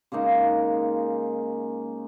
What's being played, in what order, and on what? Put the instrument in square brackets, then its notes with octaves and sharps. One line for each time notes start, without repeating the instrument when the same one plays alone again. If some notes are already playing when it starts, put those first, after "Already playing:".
[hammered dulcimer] C#3 G#3 A#3 D#4